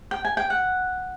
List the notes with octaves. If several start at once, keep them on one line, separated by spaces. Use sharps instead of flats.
G5
G#5
G5
F#5